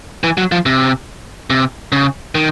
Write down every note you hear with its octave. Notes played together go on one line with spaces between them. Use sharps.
E3
F#3
F3
C3
C3
C#3
D#3